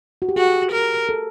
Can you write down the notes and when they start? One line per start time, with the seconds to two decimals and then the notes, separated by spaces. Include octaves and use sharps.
0.22 F#4
0.29 G4
0.36 F#4 G#4
0.73 A#4
1.09 A4